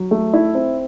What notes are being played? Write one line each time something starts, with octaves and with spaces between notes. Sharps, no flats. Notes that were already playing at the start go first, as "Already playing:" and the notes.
Already playing: F#3
A3
E4
C4